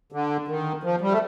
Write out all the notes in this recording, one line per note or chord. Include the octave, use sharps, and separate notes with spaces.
D3
D#3
F3
G3
A3